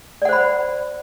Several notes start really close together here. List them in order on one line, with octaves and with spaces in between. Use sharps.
D5 F#5 C5 B5